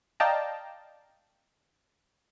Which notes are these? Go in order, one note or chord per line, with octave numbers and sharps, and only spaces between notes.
D5 D#5 F5 G5 A5 A#5